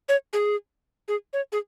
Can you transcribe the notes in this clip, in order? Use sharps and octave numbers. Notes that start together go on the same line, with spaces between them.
C#5
G#4
G#4
C#5
G#4